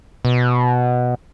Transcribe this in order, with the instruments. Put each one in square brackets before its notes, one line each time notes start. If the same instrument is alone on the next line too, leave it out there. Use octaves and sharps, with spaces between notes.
[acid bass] B2